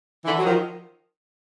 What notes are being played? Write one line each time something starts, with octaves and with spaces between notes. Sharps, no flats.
D3 E3
F#3
D#3 F3